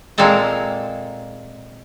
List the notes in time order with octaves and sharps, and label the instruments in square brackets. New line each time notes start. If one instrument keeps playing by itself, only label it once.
[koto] A#2 G#3 A#3 C4 A4 A#5